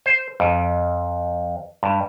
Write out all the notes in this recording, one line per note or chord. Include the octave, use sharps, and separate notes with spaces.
C5
F2
G2